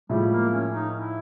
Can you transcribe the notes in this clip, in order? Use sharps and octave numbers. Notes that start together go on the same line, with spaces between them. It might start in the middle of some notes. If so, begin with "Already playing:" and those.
A2 F3 G3 G#3
A#3
C#4
D#4
E4